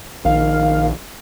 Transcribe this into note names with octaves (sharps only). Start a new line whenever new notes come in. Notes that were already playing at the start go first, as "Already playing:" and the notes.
A#1 D#3 F5